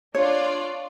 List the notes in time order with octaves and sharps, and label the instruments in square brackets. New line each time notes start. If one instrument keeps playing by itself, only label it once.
[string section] D4 F4 D5 [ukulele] C#5